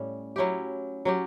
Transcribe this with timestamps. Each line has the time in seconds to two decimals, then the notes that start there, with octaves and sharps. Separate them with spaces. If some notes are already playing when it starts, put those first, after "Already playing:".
Already playing: A2 G3 C#4
0.36 F#3 C#4 E4 G4
1.05 F#3 C#4 G4